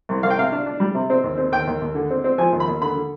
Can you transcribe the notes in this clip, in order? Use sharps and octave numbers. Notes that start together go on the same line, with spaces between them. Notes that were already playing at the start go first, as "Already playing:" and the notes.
C2
C2 F5
G5
C3 F5
D4
D4
G3
C3
C4
D#2
C4
D#2 G5
D#2
D#2
D3
C4
C4
F3 G#5
D#2
B5
D#2
D3 B5
D3